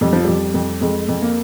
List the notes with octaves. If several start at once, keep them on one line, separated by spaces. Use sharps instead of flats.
F2 G3
F3
F2 G3
F2
F2 G#3
F2
A#3